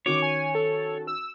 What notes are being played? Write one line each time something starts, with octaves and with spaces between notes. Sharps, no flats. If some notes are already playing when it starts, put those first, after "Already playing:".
D#3 C#4 F#4 C#5 D6
G#5
A4
E6